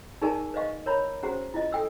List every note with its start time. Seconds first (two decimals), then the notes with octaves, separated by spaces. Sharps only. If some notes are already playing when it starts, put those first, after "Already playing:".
0.22 D#4 G#4 A#4 D5 G#5 A5
0.54 B4 D5 D#5 F5 C#6
0.86 A#4 C#5 A#5 B5
1.23 C#4 F#4 G#4 C5 F#5 A#5
1.54 E4 F4 D#5
1.73 A4 G5 E6